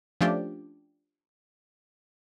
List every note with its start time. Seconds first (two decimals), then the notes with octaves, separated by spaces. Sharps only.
0.21 F3 A3 C#4 D4 F4 G4